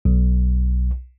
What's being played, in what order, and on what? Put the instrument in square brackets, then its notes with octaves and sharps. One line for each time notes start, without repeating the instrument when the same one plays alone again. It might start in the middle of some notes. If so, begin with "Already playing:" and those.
[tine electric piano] B1